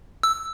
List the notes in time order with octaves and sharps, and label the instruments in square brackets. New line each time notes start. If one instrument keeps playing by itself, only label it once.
[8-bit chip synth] E6